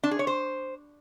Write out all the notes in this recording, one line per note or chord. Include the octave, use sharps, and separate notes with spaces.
D4
G#4
C#5
C5